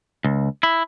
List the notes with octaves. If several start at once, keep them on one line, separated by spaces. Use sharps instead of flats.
C#2
E4